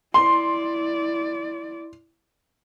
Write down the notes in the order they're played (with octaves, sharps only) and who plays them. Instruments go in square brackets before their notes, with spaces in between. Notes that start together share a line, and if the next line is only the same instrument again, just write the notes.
[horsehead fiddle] E4 D5 [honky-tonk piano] C6